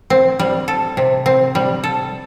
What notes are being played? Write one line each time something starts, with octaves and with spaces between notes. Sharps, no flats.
C4
G3
A4
C3
C4
G3
A4